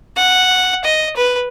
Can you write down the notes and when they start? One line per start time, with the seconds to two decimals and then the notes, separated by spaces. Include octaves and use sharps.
0.17 F#5
0.84 D#5
1.16 B4